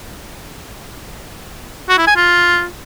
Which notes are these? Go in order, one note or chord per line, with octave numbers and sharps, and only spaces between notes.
F#4
E4
G#5
F4